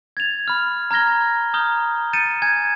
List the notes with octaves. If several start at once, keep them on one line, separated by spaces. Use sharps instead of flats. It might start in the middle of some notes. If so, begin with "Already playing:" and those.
G#6 A6 F7
B5 F6
A#5 F6 G#6 A#6 G7
A#5 D#6 F6 G6 G7
G6 A6 C#7 D#7 E7
G#5 G6 G#6